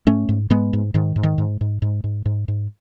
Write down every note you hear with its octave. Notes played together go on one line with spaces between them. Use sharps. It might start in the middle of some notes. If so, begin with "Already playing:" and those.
G#2 A3 C#4
G#2
G#2 G#3 B3
G#2
G#2 D#3
G#2
D#3
G#2
G#2
G#2
G#2
G#2
G#2